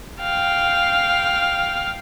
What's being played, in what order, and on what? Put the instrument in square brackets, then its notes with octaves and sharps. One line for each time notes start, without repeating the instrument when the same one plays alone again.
[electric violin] F5 G5